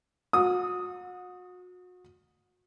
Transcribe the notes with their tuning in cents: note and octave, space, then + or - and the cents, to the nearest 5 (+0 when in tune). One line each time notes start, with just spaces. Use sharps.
F#4 -35 D#6 +0